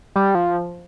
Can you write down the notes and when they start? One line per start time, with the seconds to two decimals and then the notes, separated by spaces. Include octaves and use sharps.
0.16 G3
0.35 F3